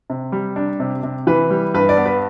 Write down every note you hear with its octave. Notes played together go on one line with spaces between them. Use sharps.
C3
G3
D4
C3
C3
E3 B4
G3
G2 B4
D5
B3
B4